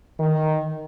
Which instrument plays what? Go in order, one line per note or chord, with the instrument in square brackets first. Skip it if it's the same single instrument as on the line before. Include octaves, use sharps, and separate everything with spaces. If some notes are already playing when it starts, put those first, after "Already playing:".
[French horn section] D#3